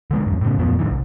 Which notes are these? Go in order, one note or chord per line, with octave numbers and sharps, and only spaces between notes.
D3 G#3 A#3
E2 G2
A2 C#3
F2 A#2 F3 B3
G#2 D3 E3
C2